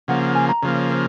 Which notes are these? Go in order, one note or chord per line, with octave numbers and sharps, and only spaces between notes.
C#3 F3 A#3 F#5
F#5
G#5
A#5
C#3 F3 A#3 C#5
C5